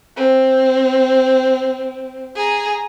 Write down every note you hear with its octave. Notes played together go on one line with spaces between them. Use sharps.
C4
G#4 A#5